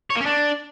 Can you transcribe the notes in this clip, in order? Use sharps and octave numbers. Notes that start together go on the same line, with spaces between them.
C#5
A#3
C#4
D4